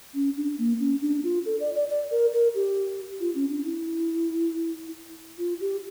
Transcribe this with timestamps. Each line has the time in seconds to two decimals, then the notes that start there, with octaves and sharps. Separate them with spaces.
0.15 C#4
0.37 D4
0.58 A#3
0.80 C#4
1.02 D4
1.23 F4
1.46 A4
1.60 D5
1.74 D5
1.89 D5
2.11 A#4
2.33 A#4
2.55 G4
3.20 F4
3.35 C#4
3.50 D4
3.64 E4
5.39 F4
5.61 G4